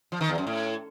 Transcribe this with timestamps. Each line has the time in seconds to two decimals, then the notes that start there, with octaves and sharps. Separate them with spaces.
0.12 F3
0.21 D#3
0.29 E2
0.38 F#2
0.47 A2